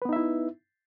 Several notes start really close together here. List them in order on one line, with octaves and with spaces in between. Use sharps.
B4 B3 D#4 E5 E4